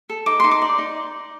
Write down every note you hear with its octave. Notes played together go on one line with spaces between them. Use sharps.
A4
D#4 D6
D#4 C6
D6
D5
D#4